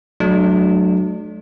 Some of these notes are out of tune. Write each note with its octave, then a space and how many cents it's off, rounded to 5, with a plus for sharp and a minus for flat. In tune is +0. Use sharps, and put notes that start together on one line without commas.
F#3 +0 A3 -25 D4 +30